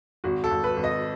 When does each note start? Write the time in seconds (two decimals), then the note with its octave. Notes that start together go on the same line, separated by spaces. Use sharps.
0.24 G#1 F#4
0.44 A4
0.50 G#1
0.64 B4
0.77 G#1
0.84 D#5